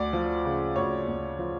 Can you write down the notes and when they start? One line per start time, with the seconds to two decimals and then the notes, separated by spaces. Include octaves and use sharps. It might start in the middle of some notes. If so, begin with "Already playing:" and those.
Already playing: D2 D5
0.13 F3
0.45 C#3
0.76 D2 C#5
1.08 D2
1.39 F3